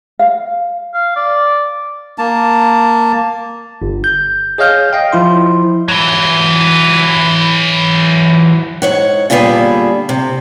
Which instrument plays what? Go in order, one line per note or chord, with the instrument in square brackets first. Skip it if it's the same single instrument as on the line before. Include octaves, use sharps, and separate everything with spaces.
[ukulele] F5
[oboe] F5
D5
[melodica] A#3 A5
[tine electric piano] G1
G6
G#4 C#5 D#5 F5 F6 G6
D#5 F5 G5
F3 E4 C6
[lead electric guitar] E3 F#3
[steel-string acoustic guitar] G#2 C#5 F#5
A#2 D3 G3 B3 G#4 A4
C3